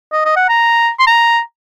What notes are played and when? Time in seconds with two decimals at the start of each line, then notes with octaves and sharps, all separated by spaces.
0.12 D#5
0.25 D#5
0.36 F#5
0.49 A#5
0.99 C6
1.07 A#5